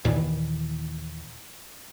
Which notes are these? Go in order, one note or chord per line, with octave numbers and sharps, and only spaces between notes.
D#2 A#2 D#3 E3